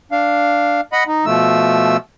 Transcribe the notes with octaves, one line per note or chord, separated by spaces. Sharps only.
D4 F5
D#5 F#5 B5
D#4
B2 F3 A3 E6